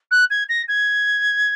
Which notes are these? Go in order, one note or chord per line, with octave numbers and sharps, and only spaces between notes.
F#6
G#6
A#6
G#6